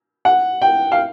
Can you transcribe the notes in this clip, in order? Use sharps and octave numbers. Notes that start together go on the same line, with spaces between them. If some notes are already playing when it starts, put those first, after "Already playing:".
F#5
G5
F5